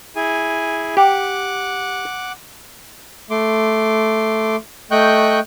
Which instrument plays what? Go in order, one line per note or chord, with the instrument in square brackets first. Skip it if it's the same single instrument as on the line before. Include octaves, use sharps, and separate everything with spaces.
[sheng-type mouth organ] E4 G#4 G#5
[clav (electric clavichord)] G4 [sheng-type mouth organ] F#5 D6
[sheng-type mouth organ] A3 C6 D6
A3 D#5 G5 C#6 F#6 G6